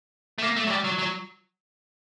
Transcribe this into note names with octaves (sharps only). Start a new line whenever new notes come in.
A3
A#3
A3
F#3
G3
F#3
F#3